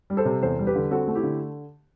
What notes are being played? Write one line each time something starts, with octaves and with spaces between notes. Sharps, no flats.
G3
A4 C5
C3
E2 A4 C5
G3
G4 B4
D3
C4 F#4 A4
A3
E4 G4
D3